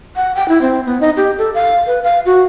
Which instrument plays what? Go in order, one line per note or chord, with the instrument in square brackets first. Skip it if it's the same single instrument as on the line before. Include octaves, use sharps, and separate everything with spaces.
[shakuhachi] F#5
G5
E4
C4
B3
D#4
G4
A4
F5
B4
F5
F#4